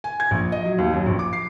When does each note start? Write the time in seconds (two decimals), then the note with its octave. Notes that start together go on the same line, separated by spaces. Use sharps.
0.04 G#5
0.20 G#6
0.31 A#1
0.52 D#5
0.65 F#3
0.78 D#2
0.93 F#2
1.06 A#1
1.19 D6
1.33 C7